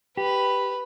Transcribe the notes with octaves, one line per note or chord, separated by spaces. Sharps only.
G4 B4